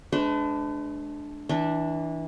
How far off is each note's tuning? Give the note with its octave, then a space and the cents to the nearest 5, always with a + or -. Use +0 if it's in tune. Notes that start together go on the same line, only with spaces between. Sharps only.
G#3 +40 D4 +0 B4 +45
E3 -25 D4 +0